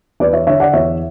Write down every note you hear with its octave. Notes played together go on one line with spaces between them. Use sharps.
E2 B4 D5
C#5 E5
D3 C#5 E5
D5 F#5
E2 C#5 E5